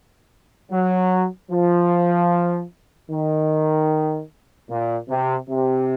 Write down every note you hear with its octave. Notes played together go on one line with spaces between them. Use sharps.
F#3
F3
D#3
A#2
C3
C3